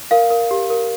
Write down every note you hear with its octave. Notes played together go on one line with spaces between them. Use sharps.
A#4 F5
A#4
G4
A#4